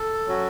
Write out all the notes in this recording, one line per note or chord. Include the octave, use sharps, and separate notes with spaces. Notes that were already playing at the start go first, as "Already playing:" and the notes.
Already playing: A4
F#3 C#4 F#4